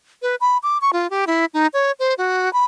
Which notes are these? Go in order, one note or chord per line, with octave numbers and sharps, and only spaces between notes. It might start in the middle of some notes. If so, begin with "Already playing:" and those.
B4
B5
D6
C#6
F4
G4
E4
D#4
C#5
C5
F#4
B5